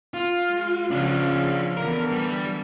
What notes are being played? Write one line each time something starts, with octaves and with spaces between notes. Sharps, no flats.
F4
G#3
C#3 F3 D4 F4
D3 E3 B3 A#4
G3